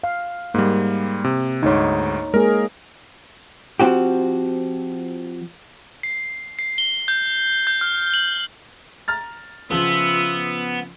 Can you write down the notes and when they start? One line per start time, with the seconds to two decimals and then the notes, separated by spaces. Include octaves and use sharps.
0.04 F5
0.54 G#2 G3 A#3
1.24 C3
1.63 D2 G#2 D#4 C#5
2.34 G#3 A#3 G#4 A#4
3.80 F3 C4 F#4 G4
6.03 C7
6.59 C7
6.78 G7
7.08 G6
7.67 G6
7.81 F6
8.14 F#7
9.08 A#5 F6 A6
9.71 C#3 F3 B3 F4 E5